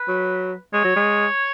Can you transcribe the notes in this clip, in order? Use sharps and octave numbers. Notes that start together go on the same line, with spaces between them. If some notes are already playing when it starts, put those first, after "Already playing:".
Already playing: B4
F#3
G#3 C#5
F#3
G#3